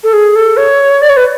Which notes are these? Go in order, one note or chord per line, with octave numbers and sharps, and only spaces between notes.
A4
G#4
A4
C#5
D5
C#5
B4